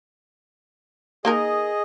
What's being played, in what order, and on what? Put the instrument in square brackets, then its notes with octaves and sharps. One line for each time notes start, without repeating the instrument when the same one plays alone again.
[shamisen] A#3 D#4 A#4 [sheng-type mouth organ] G#4 D#5